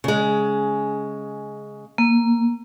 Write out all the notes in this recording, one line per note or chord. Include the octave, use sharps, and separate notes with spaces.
C#3 G#3
A#3